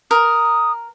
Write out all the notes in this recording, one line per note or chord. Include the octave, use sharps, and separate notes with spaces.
A#4 D#6